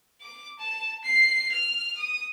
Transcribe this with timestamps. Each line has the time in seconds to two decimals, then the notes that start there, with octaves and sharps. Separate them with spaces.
0.21 D6
0.59 A5
1.04 C7
1.52 F6
1.97 D#6